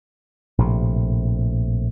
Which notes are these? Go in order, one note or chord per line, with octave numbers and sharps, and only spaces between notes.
A#1 A2 C3